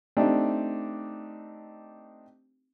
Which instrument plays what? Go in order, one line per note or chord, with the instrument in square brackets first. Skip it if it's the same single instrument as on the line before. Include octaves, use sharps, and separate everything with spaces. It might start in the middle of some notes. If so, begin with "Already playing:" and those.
[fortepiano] A3 C4 D4 D#4 G4